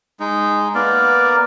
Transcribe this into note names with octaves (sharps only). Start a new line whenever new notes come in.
G#3 D#4
A#3 B3 A#4 D5